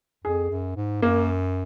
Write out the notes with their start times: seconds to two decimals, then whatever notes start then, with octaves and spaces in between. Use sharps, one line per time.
0.24 F2 G#4
0.50 F#2
0.76 G#2
1.02 F#2 A#3